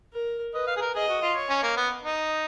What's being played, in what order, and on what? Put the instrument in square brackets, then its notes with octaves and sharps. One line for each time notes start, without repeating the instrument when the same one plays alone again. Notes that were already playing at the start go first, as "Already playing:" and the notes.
[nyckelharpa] A#4
[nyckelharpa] B4 [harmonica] D#5
[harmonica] F5
G#4
A#4
[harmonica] G#4 [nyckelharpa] D#5
[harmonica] F#4
F4
[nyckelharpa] C#5
[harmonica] C#4
A#3
B3
D#4